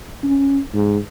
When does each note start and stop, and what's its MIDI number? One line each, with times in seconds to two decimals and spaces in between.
0.23 0.59 61
0.74 0.97 44